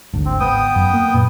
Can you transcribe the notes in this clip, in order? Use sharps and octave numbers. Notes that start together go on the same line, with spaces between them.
G#1 D2
C4
G#1 B3 G5 D#6
F#2
A#3
F#2 A#2